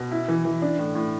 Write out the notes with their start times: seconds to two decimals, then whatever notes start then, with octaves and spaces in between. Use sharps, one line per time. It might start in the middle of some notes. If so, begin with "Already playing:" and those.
Already playing: B2
0.11 E4
0.28 E3
0.45 E3
0.62 D4
0.79 A2
0.95 A2